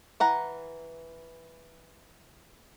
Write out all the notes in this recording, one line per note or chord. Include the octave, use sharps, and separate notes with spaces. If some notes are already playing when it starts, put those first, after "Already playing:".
E3 F#5 A#5